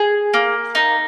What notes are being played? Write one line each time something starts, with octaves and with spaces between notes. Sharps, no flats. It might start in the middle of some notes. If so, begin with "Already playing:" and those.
Already playing: G#4
A#3
D#4